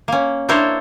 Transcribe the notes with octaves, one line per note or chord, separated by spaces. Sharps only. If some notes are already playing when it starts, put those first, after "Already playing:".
A#3 C#4
D4 E4 A#4 C5 C#5